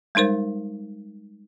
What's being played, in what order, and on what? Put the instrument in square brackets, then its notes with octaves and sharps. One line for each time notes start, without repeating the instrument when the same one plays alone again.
[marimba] G3 G#3 D#4 A#4 C5